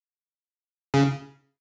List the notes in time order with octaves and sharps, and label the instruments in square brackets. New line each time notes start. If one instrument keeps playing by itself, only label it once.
[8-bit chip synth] C#3